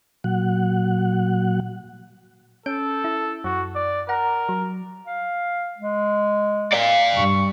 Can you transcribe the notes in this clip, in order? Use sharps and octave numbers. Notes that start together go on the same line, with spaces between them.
A#2 F#3 F#5
C#4 A4 G6 D7
E4
F#2 F#4
D5
A#4 F#5 A#5
F#3
F5
G#3
D5 F5
G2 C#6